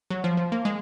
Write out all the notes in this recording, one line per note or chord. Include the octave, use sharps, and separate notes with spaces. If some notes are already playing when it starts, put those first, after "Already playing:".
F#3
F3
F3
A#3
G#3